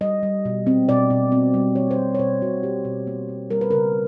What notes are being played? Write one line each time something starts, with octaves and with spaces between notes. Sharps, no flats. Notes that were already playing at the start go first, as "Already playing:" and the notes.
G3 D#5
G3
B2
C4
B2 D5
B2
C4
G3
A#3 C#5
C5
B2
C#5
B2 C5
B2 F#4
B2 G4
B2
A#3
B2
G3 A#4
B4
C#3 A#4